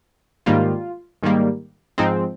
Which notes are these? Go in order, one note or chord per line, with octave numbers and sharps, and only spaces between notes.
G#2 D#3 G3 A#3 F4
G#2 D#3 G3 A#3
G#2 F3 G#3 C4 D#4